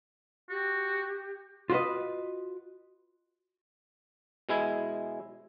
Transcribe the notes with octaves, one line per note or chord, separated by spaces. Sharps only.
F#4 G4
F4 F#4 B4 D#5
B2 G#3 E4 G#5